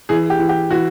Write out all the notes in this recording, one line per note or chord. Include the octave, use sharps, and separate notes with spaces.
E3 G#4
G4
E3
G4
E3 F#4